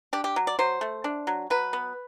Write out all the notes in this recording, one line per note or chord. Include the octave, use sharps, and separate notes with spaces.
D4 G4
G4
F#3
D5
F#3 C5
A3
D4
F#3
F#3 B4
B3